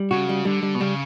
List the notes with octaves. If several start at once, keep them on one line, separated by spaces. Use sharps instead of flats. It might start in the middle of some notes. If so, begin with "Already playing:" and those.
Already playing: G3
C#3 F#4
G3
D3 G3
G3
B2
C#3 G3